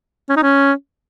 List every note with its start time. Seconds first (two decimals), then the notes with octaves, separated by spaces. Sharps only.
0.29 C#4
0.37 D#4
0.43 C#4